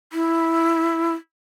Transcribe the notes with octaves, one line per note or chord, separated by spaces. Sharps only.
E4